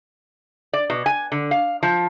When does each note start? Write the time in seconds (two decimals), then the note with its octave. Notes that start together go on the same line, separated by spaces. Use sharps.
0.73 D5
0.90 B2
1.06 G#5
1.32 D3
1.51 F5
1.83 F3